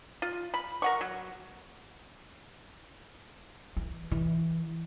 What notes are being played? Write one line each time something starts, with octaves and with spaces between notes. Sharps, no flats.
F4
B5
A#4 F#5 C#6
F#3
E3
E3